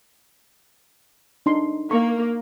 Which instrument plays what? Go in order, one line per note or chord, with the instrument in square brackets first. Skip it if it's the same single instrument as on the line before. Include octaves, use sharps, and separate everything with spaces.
[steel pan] D4 D#4 C6
[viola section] A#3 [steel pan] C#6